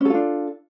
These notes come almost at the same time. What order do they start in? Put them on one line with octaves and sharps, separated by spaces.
C#4 A4 F4 D4